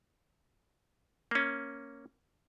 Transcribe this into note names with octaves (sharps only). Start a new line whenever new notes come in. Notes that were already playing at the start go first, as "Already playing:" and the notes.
A#3 C#4